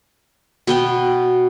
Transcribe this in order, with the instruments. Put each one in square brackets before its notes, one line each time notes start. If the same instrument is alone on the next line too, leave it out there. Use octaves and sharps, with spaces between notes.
[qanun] B2 B3 G5